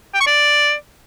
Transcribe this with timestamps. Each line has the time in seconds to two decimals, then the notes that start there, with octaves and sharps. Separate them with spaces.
0.14 G5
0.20 C#6
0.27 D5